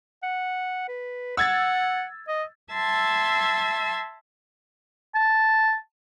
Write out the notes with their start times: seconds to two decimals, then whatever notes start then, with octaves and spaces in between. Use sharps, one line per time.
0.23 F#5
0.88 B4
1.37 F#5 E6 G#6 A6
2.28 D#5
2.72 E5 A5 C6 E6 G#6 A6
5.15 A5